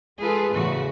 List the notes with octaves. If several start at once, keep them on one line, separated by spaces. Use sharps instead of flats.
G#3 F4 G#4 A4 B4
E2 A2 C#3 F#4